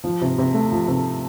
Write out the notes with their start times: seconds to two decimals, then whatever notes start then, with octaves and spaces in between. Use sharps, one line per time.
0.04 F3
0.21 C3
0.38 C3
0.54 A3
0.72 F3
0.88 C3